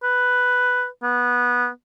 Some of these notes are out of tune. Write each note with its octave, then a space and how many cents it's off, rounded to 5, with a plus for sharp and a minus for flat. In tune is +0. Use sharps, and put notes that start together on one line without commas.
B4 +5
B3 -15